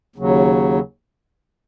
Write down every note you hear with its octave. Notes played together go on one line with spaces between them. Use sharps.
D#2 C#3 F#3